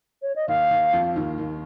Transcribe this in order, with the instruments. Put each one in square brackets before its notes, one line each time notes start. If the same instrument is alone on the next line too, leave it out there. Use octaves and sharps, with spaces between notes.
[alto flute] C#5
D#5
[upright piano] D#2 D#3 [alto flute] F5
[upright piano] D#2 D#3
F2 F3
D#2 D#3
D#2 D#3